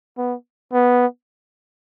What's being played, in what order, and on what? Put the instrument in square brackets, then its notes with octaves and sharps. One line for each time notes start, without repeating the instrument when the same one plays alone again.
[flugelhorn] B3
B3